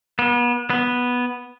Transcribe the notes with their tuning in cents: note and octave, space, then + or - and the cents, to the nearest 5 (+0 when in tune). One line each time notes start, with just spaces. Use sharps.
B3 -35
B3 -5